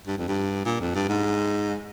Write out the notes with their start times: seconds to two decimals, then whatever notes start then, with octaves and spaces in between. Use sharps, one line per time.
0.07 G2
0.18 F2
0.28 G2
0.65 A#2
0.80 F2
0.95 G2
1.09 G#2